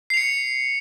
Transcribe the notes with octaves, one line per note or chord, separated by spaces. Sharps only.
C7 C#7 F7